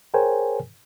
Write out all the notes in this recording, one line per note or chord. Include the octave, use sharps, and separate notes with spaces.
G#4 A#4 C5 C#5 G5 G#5